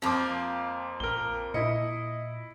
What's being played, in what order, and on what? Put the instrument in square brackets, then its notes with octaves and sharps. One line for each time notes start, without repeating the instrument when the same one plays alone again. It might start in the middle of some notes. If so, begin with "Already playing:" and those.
[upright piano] F2 C4 D6 [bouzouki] F3 A#3
[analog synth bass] A#1 [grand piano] A#4 G7
[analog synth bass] A#2 [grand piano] E4 C#7 [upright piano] D#5